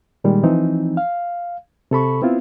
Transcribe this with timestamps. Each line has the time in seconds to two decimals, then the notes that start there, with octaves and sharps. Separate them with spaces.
0.24 A#2 D#3 G3 G#3
0.43 E3 F3 C4 D#4
0.97 F5
1.91 C3 A4 B5 C#6
2.22 B3 C4 E4 F4